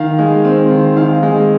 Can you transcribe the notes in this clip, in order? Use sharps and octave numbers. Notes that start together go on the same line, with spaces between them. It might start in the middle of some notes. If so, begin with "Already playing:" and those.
Already playing: D#3 F5
G#3
C4
D#3
D#3 F5
G#3